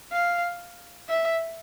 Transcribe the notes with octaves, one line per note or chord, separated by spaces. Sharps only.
F5
E5